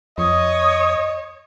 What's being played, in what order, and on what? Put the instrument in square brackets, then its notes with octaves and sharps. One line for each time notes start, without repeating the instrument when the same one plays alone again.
[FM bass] F2 [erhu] C#5 [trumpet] D#5 [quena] D#6